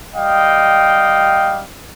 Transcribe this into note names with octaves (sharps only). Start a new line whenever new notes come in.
G3 D#5 F5 G5